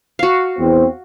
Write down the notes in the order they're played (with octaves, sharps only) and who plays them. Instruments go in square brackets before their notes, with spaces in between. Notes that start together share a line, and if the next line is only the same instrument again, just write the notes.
[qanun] F#4 F5
[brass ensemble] E2 C4